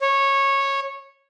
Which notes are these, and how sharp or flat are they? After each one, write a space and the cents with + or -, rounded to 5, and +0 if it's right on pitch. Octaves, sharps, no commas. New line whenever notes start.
C#5 -15